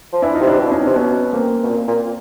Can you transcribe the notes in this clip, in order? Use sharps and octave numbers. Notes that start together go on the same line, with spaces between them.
F3
E3 D4 E4
D#4 F4
C3
D4 E4
C3
B2 D4 E4
C#4 D#4
C3 C4 D4
B2 B3 C#4
A#3 C4
B2
A#2
A#2